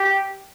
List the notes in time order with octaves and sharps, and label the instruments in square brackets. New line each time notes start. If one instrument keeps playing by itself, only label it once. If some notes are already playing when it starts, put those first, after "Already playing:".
Already playing: [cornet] G4